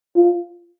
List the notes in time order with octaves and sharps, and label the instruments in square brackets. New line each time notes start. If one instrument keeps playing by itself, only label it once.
[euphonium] F4